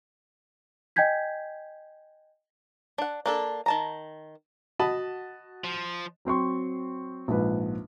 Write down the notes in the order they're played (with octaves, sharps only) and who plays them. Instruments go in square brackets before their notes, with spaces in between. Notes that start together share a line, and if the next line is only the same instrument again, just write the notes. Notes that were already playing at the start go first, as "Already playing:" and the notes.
[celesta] D#5 G5 G#5 G6 G#6 B6
[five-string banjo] D4 F#5
A#3 D4 A4
D#3 A5 A#5
[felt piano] F#4 [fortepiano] D#5 A5 B5
[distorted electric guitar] F3
[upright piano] F#3 C4 C6 C#6
A#1 G#2 F3 B4